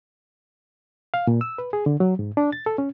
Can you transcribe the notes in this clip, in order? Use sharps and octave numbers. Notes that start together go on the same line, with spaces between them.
F5
A#2
E6
B4
G#4
D3
F#3
G#2
D4
A6
A4
C#4